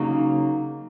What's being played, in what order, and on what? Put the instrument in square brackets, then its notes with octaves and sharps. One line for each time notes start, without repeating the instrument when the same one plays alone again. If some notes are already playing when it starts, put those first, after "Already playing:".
Already playing: [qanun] C#3 F#3 A#3 D#4